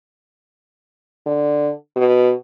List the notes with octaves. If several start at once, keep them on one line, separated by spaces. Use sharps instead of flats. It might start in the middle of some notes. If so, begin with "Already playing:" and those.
D3
B2